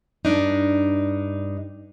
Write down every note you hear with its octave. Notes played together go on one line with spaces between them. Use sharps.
G2 D4 D#4